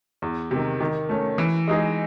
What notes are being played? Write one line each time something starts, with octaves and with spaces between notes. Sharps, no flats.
E2
C3 D#3
D#3
A3 C#4
E3
G#3 D#4 G#4